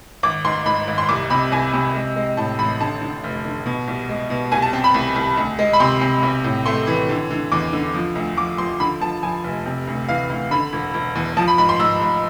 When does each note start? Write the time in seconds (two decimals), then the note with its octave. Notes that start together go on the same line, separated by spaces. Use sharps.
0.23 G#1 D6
0.45 G#2 C6
0.66 G#2 B5
0.88 G#1
0.98 C6
1.09 C2 D6
1.30 C3 B5
1.52 C2 G#5
1.74 C3
1.95 G#3
2.16 G#3
2.37 A2 A5
2.59 A1 B5
2.80 D3 A5
3.02 D3
3.24 F1
3.45 D3
3.66 B2
3.88 C2
4.09 G#3
4.30 B2
4.52 C2 G#5
4.62 A5
4.73 C4
4.84 B5
4.94 C2
5.16 C2
5.37 D2
5.59 G#3
5.73 B5
5.80 C3 C6
6.01 C3
6.23 B1
6.44 A2
6.66 A3 C6
6.87 E3
7.09 D3
7.31 D3
7.52 E2 D6
7.73 D3
7.94 F3
8.15 D2
8.37 F3 D6
8.58 F3 C6
8.80 D3 B5
9.01 F3 A5
9.23 F3 G#5
9.44 F1
9.66 C3
9.87 D2
10.09 E3 F5
10.30 D2
10.51 D3 B5
10.73 E1
10.94 E1
11.15 E2
11.37 F3 A5
11.48 B5
11.58 G#2 B5
11.69 C6
11.79 G#2 E6
12.01 G#2